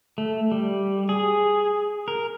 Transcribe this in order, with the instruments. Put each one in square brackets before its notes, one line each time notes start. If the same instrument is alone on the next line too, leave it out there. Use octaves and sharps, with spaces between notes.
[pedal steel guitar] A3
G3
G#4
A#4